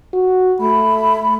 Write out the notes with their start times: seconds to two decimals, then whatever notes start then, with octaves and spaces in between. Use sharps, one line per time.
0.14 F#4
0.60 A3 B5